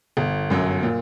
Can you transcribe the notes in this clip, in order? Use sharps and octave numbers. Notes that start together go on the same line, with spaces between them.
G1
F#2 F#3
A#2